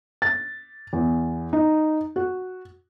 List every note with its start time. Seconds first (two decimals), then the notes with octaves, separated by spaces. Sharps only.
0.22 A6
0.93 E2
1.53 D#4
2.16 F#4